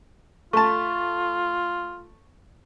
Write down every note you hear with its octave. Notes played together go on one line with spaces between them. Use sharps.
A3 F4 A5 C#6